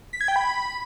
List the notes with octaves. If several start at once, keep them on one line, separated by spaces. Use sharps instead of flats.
B6
G#6
G5
B5